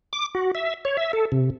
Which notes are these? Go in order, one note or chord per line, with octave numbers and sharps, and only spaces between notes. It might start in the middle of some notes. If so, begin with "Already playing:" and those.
D6
F#4
E5
C#5
E5
A4
C3